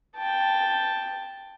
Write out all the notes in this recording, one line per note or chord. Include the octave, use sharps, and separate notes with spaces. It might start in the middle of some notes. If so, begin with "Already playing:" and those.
G5 A5